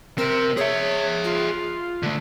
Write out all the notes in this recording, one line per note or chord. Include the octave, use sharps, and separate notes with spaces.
C3 C4 A#4
G#4 C#5 E5
F4
D3 A3